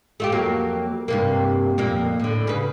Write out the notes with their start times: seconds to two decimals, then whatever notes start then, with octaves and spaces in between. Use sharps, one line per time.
0.20 A3 F4 G4
0.32 F2 F#3 A#3
1.08 G2 C3 A#3
1.78 F2 A#2 A#3
2.20 A2 D3
2.47 C#3 B4